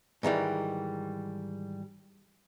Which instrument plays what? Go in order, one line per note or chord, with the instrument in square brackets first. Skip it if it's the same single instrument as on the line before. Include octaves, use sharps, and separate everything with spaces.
[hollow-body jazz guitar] G#2 D#3 E3 G3